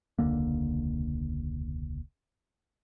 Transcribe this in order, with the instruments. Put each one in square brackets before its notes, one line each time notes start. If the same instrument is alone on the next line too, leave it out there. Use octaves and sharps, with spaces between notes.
[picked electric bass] E1 C#2 D3 A#3